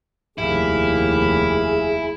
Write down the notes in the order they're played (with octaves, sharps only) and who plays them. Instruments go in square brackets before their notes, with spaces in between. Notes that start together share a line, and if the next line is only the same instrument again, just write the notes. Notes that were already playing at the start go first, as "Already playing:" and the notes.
[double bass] F1 D#2 [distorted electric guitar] E4 [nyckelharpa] G4 F5 [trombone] G#4